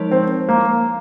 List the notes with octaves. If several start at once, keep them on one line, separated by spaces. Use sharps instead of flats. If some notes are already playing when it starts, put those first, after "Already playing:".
Already playing: F3 G#3 D#4 A#4 C#5
C4
A#3